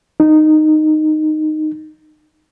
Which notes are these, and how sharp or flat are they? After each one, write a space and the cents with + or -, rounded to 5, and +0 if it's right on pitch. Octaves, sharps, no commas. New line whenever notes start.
D#4 -10